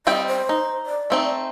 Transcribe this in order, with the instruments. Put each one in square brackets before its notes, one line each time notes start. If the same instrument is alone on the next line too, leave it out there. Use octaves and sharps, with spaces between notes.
[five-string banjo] G3 C4 G5 [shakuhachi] D#5
[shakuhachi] C5
[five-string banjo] D#4
[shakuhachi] D5
[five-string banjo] A3 C4 D#4